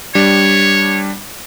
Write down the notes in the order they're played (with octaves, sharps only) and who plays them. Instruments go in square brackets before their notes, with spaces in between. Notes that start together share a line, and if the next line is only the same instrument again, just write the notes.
[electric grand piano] G3 D4 [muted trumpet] C#5